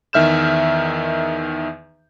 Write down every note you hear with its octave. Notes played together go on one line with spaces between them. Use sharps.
E2 D#3 E5 F6 G6 E7